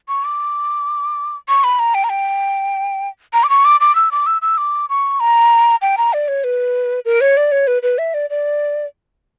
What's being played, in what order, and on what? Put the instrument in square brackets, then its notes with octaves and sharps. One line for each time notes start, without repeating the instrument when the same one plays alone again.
[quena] C#6
D6
C#6
B5
A#5
G5
A#5
G5
A#5
D6
C#6
D6
D6
E6
D6
E6
E6
D6
C#6
A#5
G5
A#5
D5
C#5
B4
A#4
C#5
D5
C#5
B4
B4
E5
D5
D5